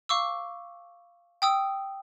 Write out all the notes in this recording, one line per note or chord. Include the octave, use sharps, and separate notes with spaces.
F5 C#6 D6 E6
G5 D#6 E6